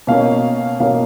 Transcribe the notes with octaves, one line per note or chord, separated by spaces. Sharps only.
B2 A#3 C#4 F5
B2 A#3 C#4 F5